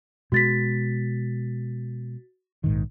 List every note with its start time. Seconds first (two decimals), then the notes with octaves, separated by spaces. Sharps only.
0.32 B2 G#3 F#4 A6 B6
2.64 A#1 G#2 D#3